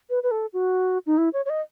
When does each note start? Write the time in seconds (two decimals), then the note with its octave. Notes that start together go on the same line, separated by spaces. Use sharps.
0.10 B4
0.23 B4
0.31 A4
0.53 F#4
1.06 D#4
1.18 E4
1.33 C#5
1.45 C#5
1.50 D#5